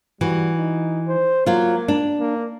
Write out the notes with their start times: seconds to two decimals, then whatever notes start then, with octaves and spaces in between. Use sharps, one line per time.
0.21 E3 G3 F#4
0.56 D#4
1.08 C5
1.46 F#3 A#3 F4
1.88 D4
2.20 A#3